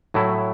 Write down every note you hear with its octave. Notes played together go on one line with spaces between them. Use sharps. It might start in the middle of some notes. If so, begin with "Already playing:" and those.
A2 F#3 A3 E4